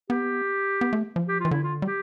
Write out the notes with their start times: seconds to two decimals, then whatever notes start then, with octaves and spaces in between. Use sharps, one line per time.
0.10 B3 G4
0.81 B3
0.93 A3
1.16 F3
1.28 G4
1.40 E3 F4
1.51 D3 E4
1.63 F4
1.82 G3
1.87 G4